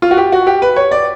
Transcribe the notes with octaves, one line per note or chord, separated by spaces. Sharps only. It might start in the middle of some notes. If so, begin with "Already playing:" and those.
F4
F#4
G4
F#4
G4
B4
C#5
D5